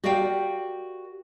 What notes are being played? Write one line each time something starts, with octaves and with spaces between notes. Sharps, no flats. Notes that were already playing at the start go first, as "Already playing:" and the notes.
F#4 G4 A#4 D5 F5 G5